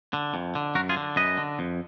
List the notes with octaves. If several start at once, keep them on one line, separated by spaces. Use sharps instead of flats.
D3
F2
D3
F#2 F#4 A#4
F4 G#4
D3
F#2 B4 D#5
D3
F2